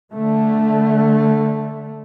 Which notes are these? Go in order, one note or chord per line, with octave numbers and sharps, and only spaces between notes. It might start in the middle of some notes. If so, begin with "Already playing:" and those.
D3 A3